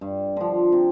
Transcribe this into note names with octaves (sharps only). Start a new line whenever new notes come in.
G2
D3 F3
C3